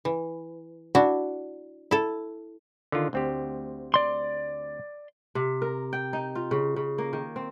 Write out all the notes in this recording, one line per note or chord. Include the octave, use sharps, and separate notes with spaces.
E3
D4 E4 F#4
E4 A4
D3 D#3 F4
D2 C4 G4
D5 C6
C3
A#4
G5
D#4
F4
C#3
C#3
A#3
D#3
C4